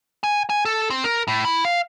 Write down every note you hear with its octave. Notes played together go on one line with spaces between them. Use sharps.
G#5
G#5
A4
C4
A#4
A2
E4
F5